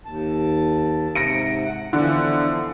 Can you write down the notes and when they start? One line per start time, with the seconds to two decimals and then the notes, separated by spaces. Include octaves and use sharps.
0.05 D#2 A5
1.15 G#2 C3 A#6 C#7 D7
1.64 F#5
1.93 D3 E3 F3 B3